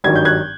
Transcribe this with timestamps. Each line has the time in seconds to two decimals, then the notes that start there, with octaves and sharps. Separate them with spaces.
0.04 G#1 G2 D#3 F#3 G#6
0.16 G6
0.25 F#6 G#6